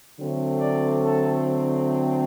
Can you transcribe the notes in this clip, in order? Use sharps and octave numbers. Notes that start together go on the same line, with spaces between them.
D3 F#3 A3 C4
D5
A4